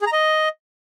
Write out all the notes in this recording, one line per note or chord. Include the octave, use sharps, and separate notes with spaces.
G#4
A#5
D#5